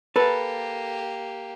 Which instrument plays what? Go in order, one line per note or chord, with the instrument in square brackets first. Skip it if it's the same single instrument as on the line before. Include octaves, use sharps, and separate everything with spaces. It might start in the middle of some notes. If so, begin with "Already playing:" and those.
[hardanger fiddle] A#3 G4 [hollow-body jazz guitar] A4 B4